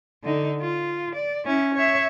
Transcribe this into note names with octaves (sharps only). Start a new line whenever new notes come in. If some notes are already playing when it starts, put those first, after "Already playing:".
D3 D#4
F4
D5
C#4 E4
C#5 E5